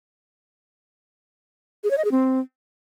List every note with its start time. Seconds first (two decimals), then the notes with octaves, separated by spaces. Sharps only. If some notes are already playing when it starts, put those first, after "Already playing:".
1.84 G#4
1.91 C#5
1.98 D#5
2.05 G#4
2.11 C4